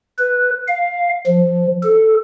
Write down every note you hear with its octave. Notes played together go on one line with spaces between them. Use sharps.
B4
F5
F3
A4